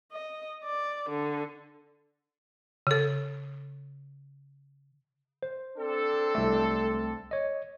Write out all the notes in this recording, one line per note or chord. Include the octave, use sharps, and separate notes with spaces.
D#5
D5
D3
C#3 A4
C5
C4 D4 A4
C2 A3
C#5 D#5